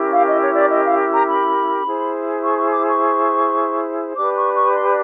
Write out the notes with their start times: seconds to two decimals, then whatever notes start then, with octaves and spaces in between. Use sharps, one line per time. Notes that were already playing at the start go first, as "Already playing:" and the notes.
Already playing: C#4 E4 G4 A#4
0.12 F5
0.27 D#5
0.41 C#5
0.56 D5
0.70 D#5
0.85 F5
1.13 A#5
1.29 B5
1.85 E4 G#4 C5
2.43 C#6
2.58 C#6
2.72 D6
2.87 C#6
4.16 D4 G4 B4 D6
4.36 C#6
4.55 C#6
4.74 C6